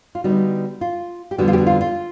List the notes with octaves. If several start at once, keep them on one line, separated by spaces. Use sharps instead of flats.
F4
D3 G3 B3 D#4 F#4
F4
G4
F2 D3 G3 B3 F#4
F4
G4
F#4
F4
F4